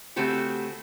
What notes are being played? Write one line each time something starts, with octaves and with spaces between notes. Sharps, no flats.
C#3 A3 C4 F#4 G4